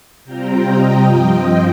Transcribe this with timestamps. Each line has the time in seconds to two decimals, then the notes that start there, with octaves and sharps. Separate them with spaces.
0.24 C3 G3 C4 F4 G5 A#5
0.66 D#5 G5
1.07 G2 F3 C4 F4 D#5 G5